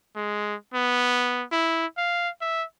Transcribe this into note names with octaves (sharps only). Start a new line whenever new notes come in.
G#3
B3
E4
F5
E5